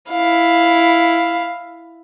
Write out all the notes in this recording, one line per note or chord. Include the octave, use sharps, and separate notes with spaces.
E4 F5